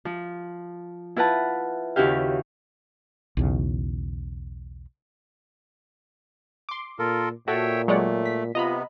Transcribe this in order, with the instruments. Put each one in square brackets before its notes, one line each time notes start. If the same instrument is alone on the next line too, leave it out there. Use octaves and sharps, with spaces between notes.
[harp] F3
E4 F4 B4 F#5 A5
D#2 C#3 E4 F#4 G4 F5
[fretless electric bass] B1 E2 C#3
[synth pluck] C6 D6
[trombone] A#2 [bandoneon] F4 A4 A#4
[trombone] A#2 [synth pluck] F#4 A4 [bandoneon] C#5 E5 G5
[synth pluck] F#3 C#5 F#5 [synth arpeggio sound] G#3 D5 [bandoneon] A3
[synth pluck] B6
[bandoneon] C3 B3 [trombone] F4 [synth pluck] D#5 A#5 B5